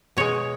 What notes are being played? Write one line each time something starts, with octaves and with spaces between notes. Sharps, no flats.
B2 G#3 C#5